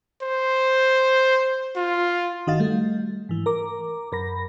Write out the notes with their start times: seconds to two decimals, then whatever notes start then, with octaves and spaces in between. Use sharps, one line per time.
0.22 C5
1.76 F4
2.47 G1 D#3 F#4 D#5 F5 A6
2.59 G3 A3
3.29 G#2 E3
3.46 A#4 A#5 D6
4.12 F#2 A#4 B5 A#6